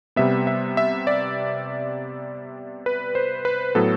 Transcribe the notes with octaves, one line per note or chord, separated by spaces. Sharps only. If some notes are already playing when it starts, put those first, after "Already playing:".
C3 G3 B3 E5
E5
E5
D5
B4
C5
B4
A2 F#3 B3 A4